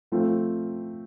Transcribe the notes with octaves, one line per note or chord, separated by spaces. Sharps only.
F3 A3 C4 F4